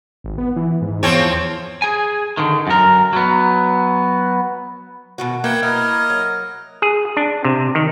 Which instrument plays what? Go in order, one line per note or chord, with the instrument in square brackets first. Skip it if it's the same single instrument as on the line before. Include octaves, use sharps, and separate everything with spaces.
[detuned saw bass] G#1
B3
E3
G#2
[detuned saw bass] E2 [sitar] F3 C4 C#5
[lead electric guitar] G#4 G#5
D3 D#3
F#2 A#4
F#3 B3
[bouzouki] B2 D#3 F#4
[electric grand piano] A#3 [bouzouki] E4 [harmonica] B4 F#5 G5 [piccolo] G#6
[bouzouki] E4 [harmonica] A#4 D#5 F6
[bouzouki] F#3
[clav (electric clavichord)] G#4
D4
C3
D#3